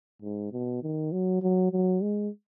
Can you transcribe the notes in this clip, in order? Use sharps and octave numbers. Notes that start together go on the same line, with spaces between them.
G#2
B2
D#3
F#3
F#3
F#3
G#3